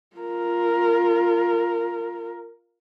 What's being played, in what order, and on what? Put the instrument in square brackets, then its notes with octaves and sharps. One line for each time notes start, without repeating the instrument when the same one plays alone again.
[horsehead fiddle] F4 A#4